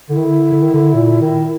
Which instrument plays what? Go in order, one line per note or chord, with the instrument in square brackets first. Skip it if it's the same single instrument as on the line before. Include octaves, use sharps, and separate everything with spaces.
[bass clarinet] D3 [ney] E4
[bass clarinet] D#3
D3
D3
D#3
D3
A#2
D#3